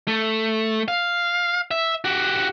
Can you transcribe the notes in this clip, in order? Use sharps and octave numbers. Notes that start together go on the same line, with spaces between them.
A3
F5
E5
F#4 G4